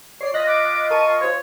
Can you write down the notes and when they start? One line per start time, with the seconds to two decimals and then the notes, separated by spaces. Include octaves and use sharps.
0.21 C#5 D5 C7
0.34 F4 D#5 F#6 A#6 B6
0.47 D6
0.90 A#4 A5 C#6 D#7
1.21 F4 C5 C#5